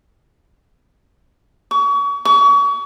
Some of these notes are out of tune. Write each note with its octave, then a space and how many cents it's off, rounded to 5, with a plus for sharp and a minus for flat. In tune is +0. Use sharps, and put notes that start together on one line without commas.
C#6 +35
C#6 +35